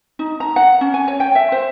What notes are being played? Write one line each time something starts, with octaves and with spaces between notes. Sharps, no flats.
D#4
A#5
F#5
C#4
G#5
C#5
G5
E5
C5